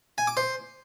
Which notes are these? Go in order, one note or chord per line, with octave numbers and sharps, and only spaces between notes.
G#5
D6
C5